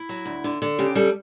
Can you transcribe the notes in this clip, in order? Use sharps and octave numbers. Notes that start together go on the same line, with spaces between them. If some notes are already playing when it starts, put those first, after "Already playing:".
Already playing: E4
F#3
D2
D3
D3
C#3 G4
G3 A4